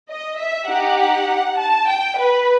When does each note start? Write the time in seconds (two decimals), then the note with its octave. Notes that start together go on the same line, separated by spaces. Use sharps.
0.10 D#5
0.39 E5
0.68 D#4 G4 F#5
1.57 A5
1.87 G5
2.17 B4